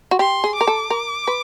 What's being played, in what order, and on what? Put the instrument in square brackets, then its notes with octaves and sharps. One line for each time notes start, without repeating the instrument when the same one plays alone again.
[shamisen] F#4
[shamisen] G4 [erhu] C6
[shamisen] G#4
[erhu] D6
[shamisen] A#4
A4
A#4
B4